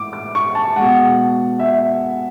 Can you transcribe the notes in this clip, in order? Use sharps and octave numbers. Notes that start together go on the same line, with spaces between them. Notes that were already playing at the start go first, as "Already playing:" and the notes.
Already playing: A2 E3 G#3 D6
D6
C#6
A5
B2 G#3 F#5
E5